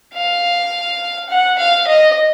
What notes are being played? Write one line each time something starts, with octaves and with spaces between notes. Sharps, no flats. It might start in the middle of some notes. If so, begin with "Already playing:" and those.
F5
F#5
F5
D#5